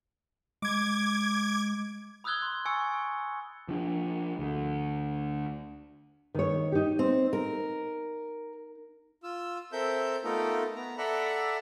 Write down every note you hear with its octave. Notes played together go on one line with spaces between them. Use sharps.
G#3 D6 G#6
B5 D#6 E6 F#6 G#6 G7
C6
G#5 C#6 E6 A6 C#7
F3 D4
D2
D#3 C#5
D#4 G4
C4
A#4
F4 E6
C4 A4 A#4 E5 G6
A3 B3 D#4 F4 A4 A#4
B3 A#5
A4 D5 E5 F#5 A#5 B5